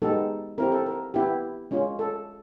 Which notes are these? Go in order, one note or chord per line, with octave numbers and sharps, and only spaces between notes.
G#3 B3 D#4 G4 A4
C4 E4 G4 A#4
A4
A#4
B3 E4 G4
G#3 C#4 F4
A4